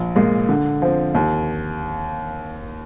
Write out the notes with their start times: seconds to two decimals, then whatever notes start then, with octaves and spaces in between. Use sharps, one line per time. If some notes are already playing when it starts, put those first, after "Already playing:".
Already playing: A#1
0.16 A#2 G#3
0.49 D3
0.82 F3 C4
1.15 D#2